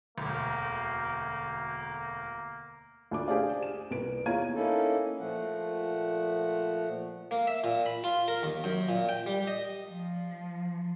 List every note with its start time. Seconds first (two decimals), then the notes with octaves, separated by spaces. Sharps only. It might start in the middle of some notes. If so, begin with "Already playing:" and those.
0.18 E1 D2 A#3
3.11 D2 D4 D6
3.28 D4 G4 G#4 C5 D5 F5
3.63 E7
3.91 C2 B4 D7
4.26 E2 C#5 F5 A#5 G#6 D#7
4.55 A#3 C#4 D#4 E4 A4
5.20 A#2 F3 A3 F#5
7.31 A#3
7.47 E5
7.64 A#2
7.86 B5
8.04 F4
8.28 A#4
8.43 D#2
8.64 F#2
8.89 A#2
9.09 G5
9.26 G3
9.47 D#5
9.88 F3